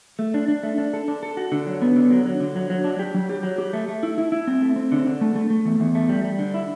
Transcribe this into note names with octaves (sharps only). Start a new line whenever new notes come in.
A3
D4
D4
A3
D4
A4
D4
A4
F#4
D3
F#3
B3
D3
F#3
F#3
D3
F#3
F#3
D4
G4
F#3
G4
F#3
G4
A3
A3
E4
E4
E4
C4
A3
C4
D3
D3
A3
A3
A3
E2
E2
A3
G3
G3
D3
E4